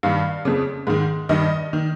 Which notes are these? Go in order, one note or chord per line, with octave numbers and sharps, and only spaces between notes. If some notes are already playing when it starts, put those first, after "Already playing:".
G2 D#3 F5
F2 C#3
G#2 D#3
G2 D#3 D#5
D#3